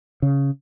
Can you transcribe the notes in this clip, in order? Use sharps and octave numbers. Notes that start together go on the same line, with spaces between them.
C#3